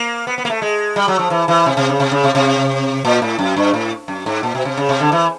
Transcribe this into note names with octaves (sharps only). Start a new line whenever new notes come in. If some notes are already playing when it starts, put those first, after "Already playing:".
Already playing: A#3
B3
B3
A#3
A3
G#3
G3
F#3
F3
E3
E3
C3
C3
C#3
C3
C#3
C3
C3
A#2
A2
F#2
G2
A2
F#2
G#2
A#2
B2
C3
C#3
C3
D3
E3